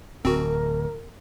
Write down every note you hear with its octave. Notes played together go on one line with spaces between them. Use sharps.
D1 C4 F#4 A#4